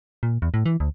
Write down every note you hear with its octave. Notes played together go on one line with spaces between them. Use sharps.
A#2
E2
A2
E3
D2